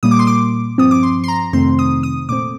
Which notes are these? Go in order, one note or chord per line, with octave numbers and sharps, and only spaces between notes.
A#2 G3 A#3 D#6
D6
C6
D6
G2 F3 C4 D#6
D6
C6
C6
A#5
F2 C3 D#3 A3 C4 C6
D#6
D#6
A#2 A3 C4 D6